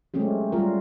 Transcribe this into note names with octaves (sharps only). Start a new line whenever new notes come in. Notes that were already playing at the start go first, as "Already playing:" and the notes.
F#3 G#3 A3 C4 C#4 G4
G3 F4 A#4